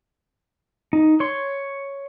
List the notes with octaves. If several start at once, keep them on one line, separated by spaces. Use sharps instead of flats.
D#4
C#5 C6